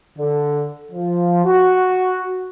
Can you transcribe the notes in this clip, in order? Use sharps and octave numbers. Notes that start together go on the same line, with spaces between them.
D3
F3
F#4